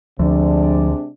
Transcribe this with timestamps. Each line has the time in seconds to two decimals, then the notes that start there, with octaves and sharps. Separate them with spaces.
0.19 D2 C3 F3 G#3 D4